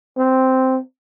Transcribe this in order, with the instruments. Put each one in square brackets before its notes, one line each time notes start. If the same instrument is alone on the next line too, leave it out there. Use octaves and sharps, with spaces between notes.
[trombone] C4